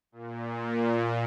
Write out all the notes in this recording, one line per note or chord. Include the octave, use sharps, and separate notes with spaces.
A#2